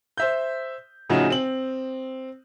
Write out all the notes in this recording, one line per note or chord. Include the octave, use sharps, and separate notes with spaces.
C5 E5 G6
A2 C#3 F3 D#4 F#4
C4 F#7